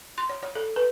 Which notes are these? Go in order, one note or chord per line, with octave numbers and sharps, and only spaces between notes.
C6
C#5
C#5
A4
B4